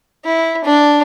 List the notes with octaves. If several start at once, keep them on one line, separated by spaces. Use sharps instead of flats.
E4
D4